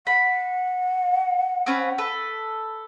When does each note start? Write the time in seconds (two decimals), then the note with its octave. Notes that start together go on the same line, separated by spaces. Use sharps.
0.07 F#5 B5
1.66 C4 C#4 B4
1.98 A4 B4